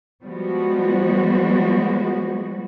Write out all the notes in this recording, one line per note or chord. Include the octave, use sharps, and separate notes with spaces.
F3 G3 G#3 B3 F#4